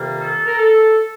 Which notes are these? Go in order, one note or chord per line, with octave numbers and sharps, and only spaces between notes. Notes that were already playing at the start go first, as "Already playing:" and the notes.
Already playing: F2 C3 D#3 G3 A#3
A4
A#4
A4